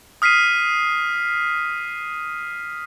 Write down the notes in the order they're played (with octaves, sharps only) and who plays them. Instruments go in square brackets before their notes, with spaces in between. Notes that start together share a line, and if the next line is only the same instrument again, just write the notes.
[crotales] D#6 F6 B6 C7 D#7